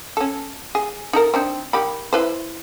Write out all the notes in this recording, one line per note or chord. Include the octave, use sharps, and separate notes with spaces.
C#4 A4
G#4
D#4 A4 A#4
C4 D4 D#4
D#3 G4 B5
E4 B4 C5